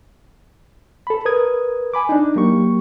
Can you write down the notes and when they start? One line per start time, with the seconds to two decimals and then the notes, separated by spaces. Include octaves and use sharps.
1.07 A4 B5
1.25 A#4 B4 D#6 G#6
1.94 G#5 B5 D6
2.09 D4 D#4
2.36 F#3 A#3 G4 C#6